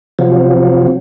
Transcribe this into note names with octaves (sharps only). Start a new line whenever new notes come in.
C3 F3 F#3